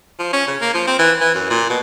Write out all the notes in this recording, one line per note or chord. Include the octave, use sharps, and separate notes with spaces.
F3
C#4
C#3
A#3
F3
C4
E3
E3
F#2
A#2
B2